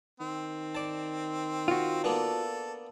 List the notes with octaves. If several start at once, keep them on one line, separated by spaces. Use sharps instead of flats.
D#3 C4
D5 A5
F4 F#4
A#3 B3 D4 A4